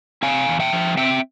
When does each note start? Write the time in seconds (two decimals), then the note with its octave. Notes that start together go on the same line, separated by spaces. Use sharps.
0.23 C4 F5 G#5
0.48 E2
0.60 E5 G5
0.73 F3
0.97 C4 E5 G5